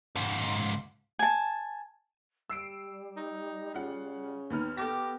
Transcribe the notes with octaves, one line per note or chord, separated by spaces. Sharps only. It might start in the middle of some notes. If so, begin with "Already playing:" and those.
C#2 G#2
G#5 A5
G3 E6 C7 D7
D#4
C#3 F4 F#5
D#2 B3 D#4 F6
B3 G4 A4 D6 A#6